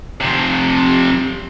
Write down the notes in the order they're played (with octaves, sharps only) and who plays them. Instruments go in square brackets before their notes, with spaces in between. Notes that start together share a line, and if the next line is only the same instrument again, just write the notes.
[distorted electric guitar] F2 C3